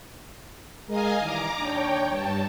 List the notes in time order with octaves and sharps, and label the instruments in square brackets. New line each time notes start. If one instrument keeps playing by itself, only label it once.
[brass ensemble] G#3 A#4 [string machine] D#5 F5 G#5
[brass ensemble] D#3 E3 G3 [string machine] A#5 D6
[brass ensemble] D#2 D4 [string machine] C#5 G5
[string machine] G2 A5